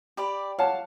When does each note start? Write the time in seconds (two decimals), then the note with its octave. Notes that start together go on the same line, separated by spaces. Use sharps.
0.17 G4 D5 B5
0.59 C#5 F5 F#5 A5